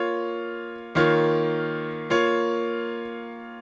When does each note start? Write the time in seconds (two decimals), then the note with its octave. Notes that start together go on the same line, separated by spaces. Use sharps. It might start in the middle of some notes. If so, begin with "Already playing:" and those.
Already playing: A#3 F4 C#5
0.95 D#3 A#3 F4 C#5
2.10 A#3 F4 C#5